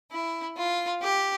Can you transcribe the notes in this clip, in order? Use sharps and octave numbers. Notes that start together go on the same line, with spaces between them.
E4
F4
G4